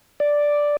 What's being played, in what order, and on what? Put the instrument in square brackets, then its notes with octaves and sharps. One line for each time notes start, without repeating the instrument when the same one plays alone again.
[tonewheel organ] D5